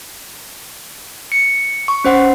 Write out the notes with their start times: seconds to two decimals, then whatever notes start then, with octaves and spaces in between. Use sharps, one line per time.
1.32 C#7
1.88 C#6
2.04 C#4 C5 F#5